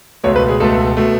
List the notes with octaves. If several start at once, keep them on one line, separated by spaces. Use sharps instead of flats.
C#2 B2 A3 C#5
B4
G#4
C#2 B2 A3 A4
B2 A3